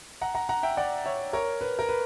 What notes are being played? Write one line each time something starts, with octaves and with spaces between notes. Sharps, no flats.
F#5 A#5
F#5 A#5
F#5 A#5
E5 G5
D5 F#5
C#5 E5
A#4 C#5
B4
A#4
B4